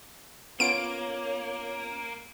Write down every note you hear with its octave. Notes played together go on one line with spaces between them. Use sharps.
A#3 B3 C#4 F4 C#5 D7